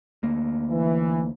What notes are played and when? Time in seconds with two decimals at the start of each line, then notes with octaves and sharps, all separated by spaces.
0.23 D2 A#3
0.70 E3